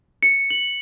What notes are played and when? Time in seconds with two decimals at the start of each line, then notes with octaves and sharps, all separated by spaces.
0.23 C#7
0.50 F#7